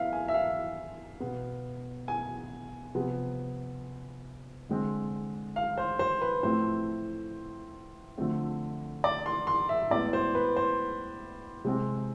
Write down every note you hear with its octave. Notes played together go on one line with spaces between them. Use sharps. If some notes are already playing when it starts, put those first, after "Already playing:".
Already playing: E3 B3 E5 F5
G#5
E5
F5
B2 B3
G#5
C3 F3 B3
D3 G#3 C4
F5
C5
C5
B4
A2 F3 A3 C4 C5
D3 F3 A3 C4
D5
C6
C6
E5
A2 G#3 B3 D5
C5
B4
C5
C3 G#3 C4